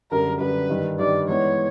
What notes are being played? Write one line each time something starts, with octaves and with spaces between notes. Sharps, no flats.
F#2 D3 G3 A#4
F#2 D3 G3 B4
G2 D#3 G3
G2 D#3 G3 D5
E3 G#3 B3 D#4 C#5